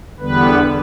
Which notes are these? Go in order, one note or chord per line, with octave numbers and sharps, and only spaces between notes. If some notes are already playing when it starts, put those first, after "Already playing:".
E2 D3 G3 B3 B4